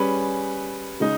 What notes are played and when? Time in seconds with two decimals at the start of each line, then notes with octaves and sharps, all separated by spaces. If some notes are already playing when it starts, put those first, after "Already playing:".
Already playing: G3 C#4 G#4 B4
1.00 C#3 G#3 D#4